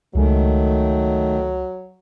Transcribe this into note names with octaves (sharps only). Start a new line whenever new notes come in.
C#2 D#3 F#3 G#3 A3